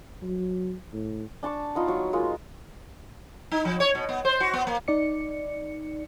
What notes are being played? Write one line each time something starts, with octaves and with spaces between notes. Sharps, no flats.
F#3
A2
D4 A5 C#6 D6
B3 D#4 F4
F#3 C#6
G#3 A#3 F4
D#4
F3
C#5
B2
B3
C5
F#4
B3
A#3
D#4 D5 C#7